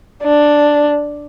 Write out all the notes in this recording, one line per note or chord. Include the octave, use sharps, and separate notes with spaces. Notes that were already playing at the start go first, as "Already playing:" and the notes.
D4